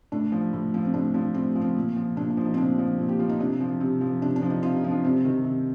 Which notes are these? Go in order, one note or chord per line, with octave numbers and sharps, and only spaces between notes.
A2 D4
F3
A2
F3
C4
A2 D4
F3 D4
A2 C4
F3
C4
A#2
F3
A#2 D4
D4
F3
D#4
C4
A#2 D4
F3
A#2
G4
F3 F4
D#4
C3 D4
F3
C3
F3
C3 D4
D4
F3
D#4
C3 F4
D#4
F3
D4
C3 C4
D#3
C3